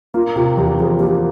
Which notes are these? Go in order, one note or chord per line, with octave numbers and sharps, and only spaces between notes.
A#3 F4
C3 F4
E2 G4
F3 G#4
A#3 G4